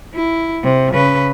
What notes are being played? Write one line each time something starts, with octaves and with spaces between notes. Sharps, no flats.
E4
C3
C#3 B4